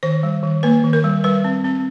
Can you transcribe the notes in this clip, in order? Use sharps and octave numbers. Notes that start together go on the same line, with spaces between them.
D#3 C5
G3
D#3
A#3 B4
D#3
A#4
G3
G3 B4
C4
C4